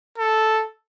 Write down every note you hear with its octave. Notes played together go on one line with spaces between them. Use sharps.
A4